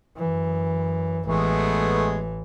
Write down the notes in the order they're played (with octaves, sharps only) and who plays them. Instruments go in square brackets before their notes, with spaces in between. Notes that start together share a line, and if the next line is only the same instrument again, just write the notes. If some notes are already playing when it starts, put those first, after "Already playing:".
[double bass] F#2 E3
[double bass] A1 E3 [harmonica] G#3 A3 B3